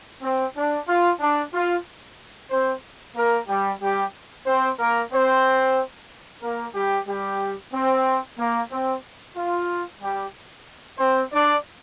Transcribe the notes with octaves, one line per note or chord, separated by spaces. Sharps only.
C4
D4
F4
D4
F4
C4 C5
A#3 A#4
G3 G4
G3 G4
C4 C5
A#3 A#4
C4 C5
A#3 A#4
G3 G4
G3 G4
C4
A#3
C4
F4
G3 G4
C4 C5
D4 D5